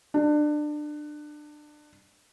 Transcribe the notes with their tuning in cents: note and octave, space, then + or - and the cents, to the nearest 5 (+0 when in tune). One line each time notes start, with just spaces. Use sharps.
D4 +25